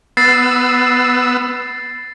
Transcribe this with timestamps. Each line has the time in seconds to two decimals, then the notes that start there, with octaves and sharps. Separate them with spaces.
0.17 B3 E6 A6 C7